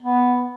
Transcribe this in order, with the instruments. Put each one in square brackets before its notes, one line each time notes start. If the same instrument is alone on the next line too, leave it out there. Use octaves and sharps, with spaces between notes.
[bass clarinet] B3